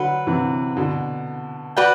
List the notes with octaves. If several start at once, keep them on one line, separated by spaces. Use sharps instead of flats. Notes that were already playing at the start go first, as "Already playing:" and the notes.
Already playing: D3 F#3 B4 F#5 C6
C3 E3
B2 D3
F#4 B4 D5 G5